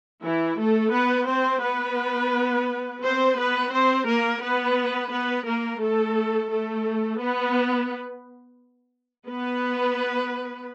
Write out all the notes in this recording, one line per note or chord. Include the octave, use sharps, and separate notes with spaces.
E3 E4
A3 A4
B3 B4
C4 C5
B3 B4
C4 C5
B3 B4
C4 C5
A#3 A#4
B3 B4
B3 B4
A#3 A#4
A3 A4
A3 A4
B3 B4
B3 B4